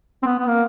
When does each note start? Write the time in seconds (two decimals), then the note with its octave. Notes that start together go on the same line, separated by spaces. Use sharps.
0.22 C4
0.26 B3
0.39 B3
0.48 A#3